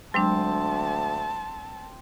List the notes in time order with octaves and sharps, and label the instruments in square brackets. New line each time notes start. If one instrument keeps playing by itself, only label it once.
[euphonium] D2 [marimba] F#3 G#3 D4 [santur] C4 [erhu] A5